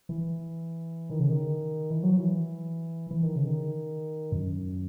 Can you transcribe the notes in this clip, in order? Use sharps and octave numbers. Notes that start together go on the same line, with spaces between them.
E3
D#3
C#3
D#3
E3
F#3
E3
E3
D#3
C#3
D#3
F#2